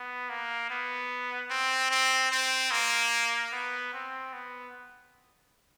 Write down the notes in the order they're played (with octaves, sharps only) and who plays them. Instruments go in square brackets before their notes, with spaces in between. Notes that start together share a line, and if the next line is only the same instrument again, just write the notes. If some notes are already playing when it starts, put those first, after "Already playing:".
Already playing: [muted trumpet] B3
A#3
B3
C4
C4
C4
A#3
B3
C4
B3